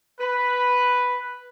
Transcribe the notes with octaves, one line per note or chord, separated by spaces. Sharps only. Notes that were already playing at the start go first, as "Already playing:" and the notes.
B4